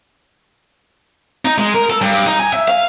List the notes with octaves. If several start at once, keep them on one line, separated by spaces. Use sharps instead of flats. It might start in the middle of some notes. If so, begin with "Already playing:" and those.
D#4
G#3
A#4
A4
G2
D#4
G#5
E5
F5